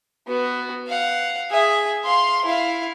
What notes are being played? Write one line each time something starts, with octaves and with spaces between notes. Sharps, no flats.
B3 F#4
F5 F#5
G#4 E5
F5 C6
E4 F5